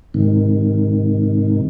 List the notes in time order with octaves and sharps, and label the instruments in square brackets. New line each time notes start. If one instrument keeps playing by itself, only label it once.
[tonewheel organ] G#2 C3 D#3